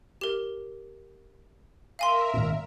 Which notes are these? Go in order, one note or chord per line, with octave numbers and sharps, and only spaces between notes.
G4 A#4
A#4 E5 F5 G#5 C6
G#1 A#2